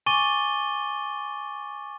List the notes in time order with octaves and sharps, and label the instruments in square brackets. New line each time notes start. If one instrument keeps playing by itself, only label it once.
[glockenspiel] G#5 C#6 D6 A6 D#7 G7